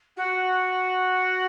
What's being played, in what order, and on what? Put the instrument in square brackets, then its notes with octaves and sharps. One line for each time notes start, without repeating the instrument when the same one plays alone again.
[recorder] F#4